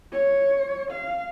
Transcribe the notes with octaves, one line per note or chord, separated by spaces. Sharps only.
C#5
F5